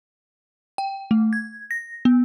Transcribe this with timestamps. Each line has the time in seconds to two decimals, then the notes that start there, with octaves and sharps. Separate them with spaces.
0.78 G5
1.11 A3
1.33 G#6
1.71 A#6
2.05 B3